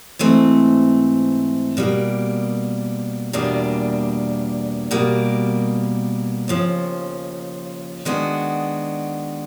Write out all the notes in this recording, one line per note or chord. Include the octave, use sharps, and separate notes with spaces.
G#2 E3 A3 C4
B2 G3 A#3
E2 B2 G3 A#3 D4
B2 G3 A#3
D#2 C#3 F3
D#3 G#3 B3 D4 F#4